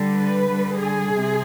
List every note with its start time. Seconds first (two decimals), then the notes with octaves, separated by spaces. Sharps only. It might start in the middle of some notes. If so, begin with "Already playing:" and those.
Already playing: D3 G3
0.16 B4
0.47 D3 G3
0.81 G#4
1.13 C3